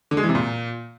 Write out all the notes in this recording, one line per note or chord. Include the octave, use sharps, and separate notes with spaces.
D3
G#3
E3
C3
A#2